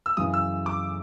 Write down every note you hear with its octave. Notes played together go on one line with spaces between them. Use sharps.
E6
F#2 C#3 E3 D#6
E6
D6